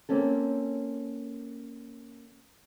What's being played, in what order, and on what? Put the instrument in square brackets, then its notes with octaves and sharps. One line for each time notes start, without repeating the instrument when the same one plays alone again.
[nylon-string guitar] A#3 C4 C#4 A4